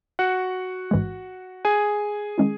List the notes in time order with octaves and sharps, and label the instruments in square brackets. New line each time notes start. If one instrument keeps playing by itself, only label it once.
[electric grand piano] F#4 F#5
[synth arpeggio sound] A1 G#2 E3 G#3
[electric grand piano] G#4 G#5
[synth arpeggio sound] D#3 G#3 C#4 E4